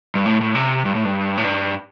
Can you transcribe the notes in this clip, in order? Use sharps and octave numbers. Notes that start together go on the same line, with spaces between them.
G2
A2
A2
C3
G2
A2
G2
A2
G2